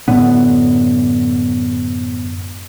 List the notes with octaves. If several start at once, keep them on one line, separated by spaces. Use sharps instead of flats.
F#2 A2 D3 B3